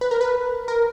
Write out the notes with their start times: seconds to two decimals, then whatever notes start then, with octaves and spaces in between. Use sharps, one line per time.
0.01 B4
0.11 A#4
0.21 B4
0.68 A#4